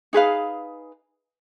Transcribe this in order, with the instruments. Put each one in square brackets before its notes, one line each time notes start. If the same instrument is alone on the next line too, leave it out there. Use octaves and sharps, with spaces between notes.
[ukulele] D#4 G#4 B4 F5